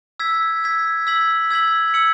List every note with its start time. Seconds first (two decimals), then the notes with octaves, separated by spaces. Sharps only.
0.20 E6 G#6 B6
0.64 E6 G#6 B6
1.07 E6 G#6 B6 F#7
1.50 E6 G#6 B6 F#7
1.94 E6 C#7 F#7